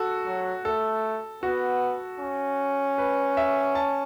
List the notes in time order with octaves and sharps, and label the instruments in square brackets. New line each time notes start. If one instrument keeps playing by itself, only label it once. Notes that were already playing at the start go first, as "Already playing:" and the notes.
Already playing: [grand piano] F#4 A4
[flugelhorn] F#3
[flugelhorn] A3 [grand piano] A4
[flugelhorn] B3 [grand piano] F#4
[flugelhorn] C#4
[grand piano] B4
E5
A5